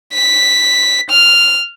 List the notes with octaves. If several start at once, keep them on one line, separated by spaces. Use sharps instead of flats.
B6
F6